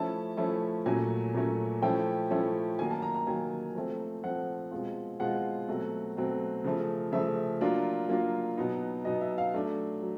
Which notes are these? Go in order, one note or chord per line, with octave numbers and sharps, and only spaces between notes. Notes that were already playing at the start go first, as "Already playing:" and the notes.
Already playing: F3 A3 C#4 E4 A5
F3 A3 C#4 E4
A#2 F#3 A3 C#4 G#5
A#2 F#3 A3 C#4
F3 A3 C#4 E4 G5
F3 A3 C#4 E4
D#3 F#3 A#3 G#5
A5
A#5
A#5
D#3 F#3 A#3 G#5
F3 A3 C4
F3 A3 C4 F#5
B2 G#3 C4 F4
B2 G#3 C4 F4 F#5
B2 F#3 A3 C4
B2 F#3 A3 C4
C#3 F3 A3
C#3 F3 A3 E5
F#3 A#3 D4 F4
F#3 A#3 D4 F4
B2 F#3 B3 D#4
B2 F#3 B3 D#4 D#5
E5
F5
F#3 A3 D4
F#3